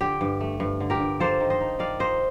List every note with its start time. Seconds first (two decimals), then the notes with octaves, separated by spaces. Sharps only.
0.01 D3 G4
0.21 G2
0.40 A3
0.60 G2
0.80 D3
0.90 G4 A#4
1.00 G2
1.20 A#3 A4 C5
1.40 D#3
1.50 C5 D#5
1.61 D#4
1.79 D#3 D5 F5
1.99 A#3 C5 D#5